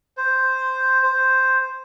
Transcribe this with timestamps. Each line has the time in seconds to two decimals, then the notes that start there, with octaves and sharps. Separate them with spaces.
0.17 C5
1.03 C5